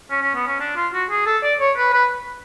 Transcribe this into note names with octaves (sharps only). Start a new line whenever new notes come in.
C#4
C#4
B3
C#4
D4
F4
F#4
G#4
A4
D5
C#5
B4
B4